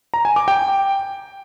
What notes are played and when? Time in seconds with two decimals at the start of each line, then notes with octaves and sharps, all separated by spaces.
0.14 A#5
0.25 G#5
0.36 D6
0.48 G5